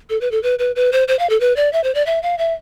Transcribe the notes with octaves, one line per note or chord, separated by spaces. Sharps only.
A4
B4
A4
B4
B4
B4
C5
C5
F5
A4
B4
D5
E5
C5
D5
E5
F5
E5